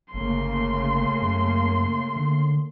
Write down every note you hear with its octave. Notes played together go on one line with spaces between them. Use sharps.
G1 C#3 A3 A#3 C6
F#2
D3